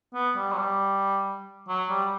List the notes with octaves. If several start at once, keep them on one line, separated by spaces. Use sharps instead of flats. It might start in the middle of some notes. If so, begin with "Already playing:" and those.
B3
G3
F#3
G3
F#3
G3